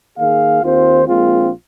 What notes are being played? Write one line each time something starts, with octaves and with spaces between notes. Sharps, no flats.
D#3 A#3 G#4 F5
D#2 D#3 C4 F4 C5
A#1 A#2 G#3 C4 F4